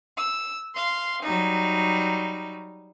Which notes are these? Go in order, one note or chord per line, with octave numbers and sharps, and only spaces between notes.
E6
F5 C6
F#3 G3 D#4